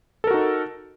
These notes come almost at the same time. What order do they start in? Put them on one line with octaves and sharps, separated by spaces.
A4 A#4 F#4 D#4